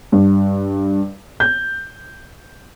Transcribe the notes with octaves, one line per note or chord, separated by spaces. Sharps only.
G2
G6